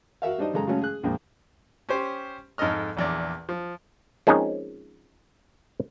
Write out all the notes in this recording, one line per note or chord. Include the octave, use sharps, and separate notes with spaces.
F#4 A#4 E5 F5
G3 D4 D#4 C5 D#5
F#2 C#3 G#3 A4 A#5
C#3 F#3 G#3 A3 C#4
G#4 F#6
A#1 F2 G#3 A#3 G5
C#4 G4 C5
F2 G#2 D#4 A4 D#5 F6
A#1 E2 D5
F3
F3 G#3 A#3 C4 C#4 D#4